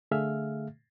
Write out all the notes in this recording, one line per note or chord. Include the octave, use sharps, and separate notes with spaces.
D3 A3 G#4 E5 F5 F6